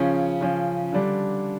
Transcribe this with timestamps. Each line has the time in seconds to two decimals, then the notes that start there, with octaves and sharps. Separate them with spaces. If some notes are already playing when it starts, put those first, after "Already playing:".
Already playing: C#3 F3 C#4
0.41 C#3 F3 C#4
0.93 D3 G3 D4